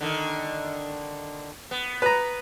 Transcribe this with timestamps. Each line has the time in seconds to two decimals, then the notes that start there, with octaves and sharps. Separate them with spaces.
0.01 D3 D#3
1.71 B3
2.02 B4 A#5